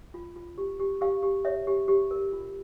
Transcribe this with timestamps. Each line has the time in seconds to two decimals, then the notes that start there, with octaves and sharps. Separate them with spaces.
0.14 F4
0.36 F4
0.58 G4
0.80 G4
1.01 G4 F5
1.23 G4
1.45 C#5 E5
1.67 G4
1.88 G4
2.11 A#4
2.32 F4